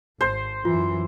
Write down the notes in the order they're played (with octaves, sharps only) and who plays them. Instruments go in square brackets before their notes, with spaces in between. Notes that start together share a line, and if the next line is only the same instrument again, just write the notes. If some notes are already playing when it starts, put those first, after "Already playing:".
[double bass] G#1 [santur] C5
[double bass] F#2 E3 [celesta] F4